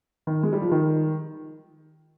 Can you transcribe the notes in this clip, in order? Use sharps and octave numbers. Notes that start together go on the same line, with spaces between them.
D#3
G#3
G3
F3
D#3